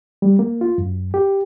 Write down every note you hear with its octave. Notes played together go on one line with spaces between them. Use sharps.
G3
A#3
F4
F#2
G4